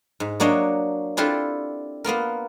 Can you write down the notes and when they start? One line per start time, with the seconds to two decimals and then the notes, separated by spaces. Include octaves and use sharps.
0.20 G#2
0.40 F#3 A#3 D4 C#5 D#5
1.17 C4 D4 E4 F4 G4 A4
2.04 A#3 B3 F4 A#4